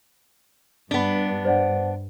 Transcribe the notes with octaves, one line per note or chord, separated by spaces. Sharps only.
G2 B3 D4
C5 D5 F#5